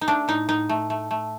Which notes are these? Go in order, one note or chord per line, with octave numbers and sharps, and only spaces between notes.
D#4
A3 D4
A2 D#4
A2 D#4
A3
A3
A3